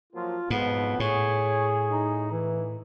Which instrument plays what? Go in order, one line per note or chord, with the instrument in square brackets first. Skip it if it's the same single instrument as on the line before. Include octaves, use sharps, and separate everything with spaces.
[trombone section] F3 F#3 A#3 [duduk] F4
[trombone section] B1 F2 [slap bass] G#2 [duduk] B3
[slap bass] A2 [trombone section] G#4 [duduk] C#5
[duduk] D#4
E3